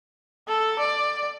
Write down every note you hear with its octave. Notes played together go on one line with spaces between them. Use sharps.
A4
D5